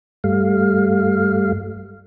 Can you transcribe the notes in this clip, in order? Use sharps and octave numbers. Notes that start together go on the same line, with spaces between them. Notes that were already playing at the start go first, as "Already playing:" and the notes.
G2 G3 A3 F5